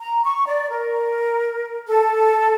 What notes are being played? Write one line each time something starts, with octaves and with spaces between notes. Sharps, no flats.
A#5
C#6
D5
A#4
A4